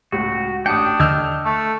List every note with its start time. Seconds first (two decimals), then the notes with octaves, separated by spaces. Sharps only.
0.12 C#2 A2 F#4
0.66 A1 D4 G5 D#6 C#7
1.00 D#2 D3 D#5 E6 F6 G6
1.45 A3